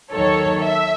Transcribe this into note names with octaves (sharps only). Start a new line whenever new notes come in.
D#2 D#3 F#3 A4 C#5
E5